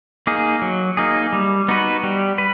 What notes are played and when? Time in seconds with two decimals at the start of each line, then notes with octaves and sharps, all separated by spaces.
0.27 A#3 D#4 G#4
0.62 F#3
0.97 A#3 D#4 G#4
1.33 G3
1.68 B3 D#4 F#4 B4
2.03 G3
2.38 B4